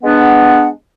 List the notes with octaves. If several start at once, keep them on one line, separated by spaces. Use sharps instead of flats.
G#3 B3 D4 B4 F#5